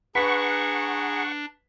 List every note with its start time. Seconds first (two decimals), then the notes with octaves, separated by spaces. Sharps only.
0.15 D4 G#4 B4 F#5 A#5 C#6 B6